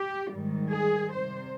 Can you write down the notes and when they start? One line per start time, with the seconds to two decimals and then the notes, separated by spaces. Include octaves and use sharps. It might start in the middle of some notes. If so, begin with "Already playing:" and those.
Already playing: G4
0.32 G#2 D#3 G3
0.71 G#4
1.11 C3 G3 C5